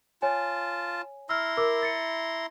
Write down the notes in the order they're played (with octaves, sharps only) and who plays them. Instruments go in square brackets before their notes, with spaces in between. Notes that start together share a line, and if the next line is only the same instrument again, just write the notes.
[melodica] F4 A5 [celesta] C#5 G#5
[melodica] E4 A#5 C6 [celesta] E6 F6
[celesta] A#4 D6 E6
A6 C#7